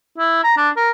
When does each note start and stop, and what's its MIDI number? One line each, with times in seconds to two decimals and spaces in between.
0.18 0.39 64
0.43 0.56 82
0.57 0.69 62
0.76 0.91 70